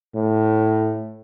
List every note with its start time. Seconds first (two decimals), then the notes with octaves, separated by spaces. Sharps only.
0.15 A2